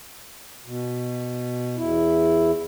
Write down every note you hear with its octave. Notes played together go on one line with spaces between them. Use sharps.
B2
E2 E4